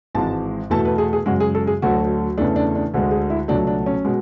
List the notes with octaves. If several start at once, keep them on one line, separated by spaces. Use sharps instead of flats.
G#1 G#2 E3 G#3 A5
E2 B2 A3 A5
B4
G#4
G#4
F#2 C#3 G#3 F#4
G#4
A4
G#4
D2 D3 F#3 A3 F#4
E2 C#3 E3 A3 D4
D4
D4
D2 D3 G#3
G#4
E4
C#2 B2 F#3 A3 D4
D4
C#4
B2 G#3